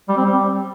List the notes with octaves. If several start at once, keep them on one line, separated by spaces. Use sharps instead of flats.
G3
C4
G3